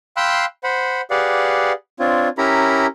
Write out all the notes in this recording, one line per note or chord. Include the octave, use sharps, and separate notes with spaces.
F5 G5 B5 C6 E6 F#6
C5 F#5 B5
G4 G#4 B4 D5 F5 F#5
C4 D4 F4 C#5
C#4 E4 G4 A#4 A#5 B5